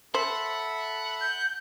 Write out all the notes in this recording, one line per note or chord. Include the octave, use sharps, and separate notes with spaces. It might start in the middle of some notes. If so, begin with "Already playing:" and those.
A4 C5 E5 F#5 B5
G6